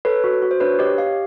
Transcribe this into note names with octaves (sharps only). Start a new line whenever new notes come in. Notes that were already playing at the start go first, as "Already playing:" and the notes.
A4 B4 C#5
F#4
F#4
C5
D4 B4 C#5
G4 C#5 D#5
G4 D#5 F5